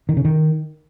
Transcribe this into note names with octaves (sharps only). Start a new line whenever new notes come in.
D#3
C#3
D#3